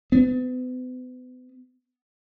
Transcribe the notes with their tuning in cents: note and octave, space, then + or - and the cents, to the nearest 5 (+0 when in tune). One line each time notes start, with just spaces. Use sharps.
B3 +40